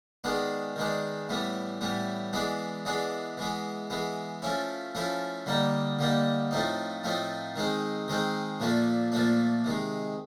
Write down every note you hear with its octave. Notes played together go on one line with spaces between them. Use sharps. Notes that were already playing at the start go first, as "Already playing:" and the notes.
D#3 G#3 B3 D4
D#3 G#3 B3 D4
A2 E3 G3 B3
A2 E3 G3 B3
E3 G#3 B3 D4
E3 G#3 B3 D4
E3 G#3 B3
E3 G#3 B3
F3 A3 C#4 E4
F3 A3 C#4 E4
D3 G3 A#3 D#4
D3 G3 A#3 D#4
A2 F3 A3 C4 D#4
A2 F3 A3 C4 D#4
D#3 G#3 C4 D#4
D#3 G#3 C4 D#4
A#2 F3 A3 D4
A#2 F3 A3 D4
C3 D#3 G#3